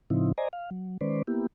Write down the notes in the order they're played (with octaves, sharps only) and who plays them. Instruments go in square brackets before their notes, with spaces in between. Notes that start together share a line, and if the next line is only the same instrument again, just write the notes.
[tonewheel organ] A2 C#3 F3 C4 D#4 E4
C5 D5 D#5 G#5 A#5
F5
F#3
D#3 G#3 C#4 B4 C5 D5
A#3 B3 E4 G4